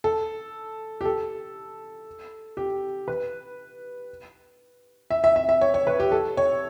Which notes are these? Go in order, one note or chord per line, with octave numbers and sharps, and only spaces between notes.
A4
G4
A4
G4
B4
E5
E5
E5
E5
C#5
C#5
B4
G4
A4
C#5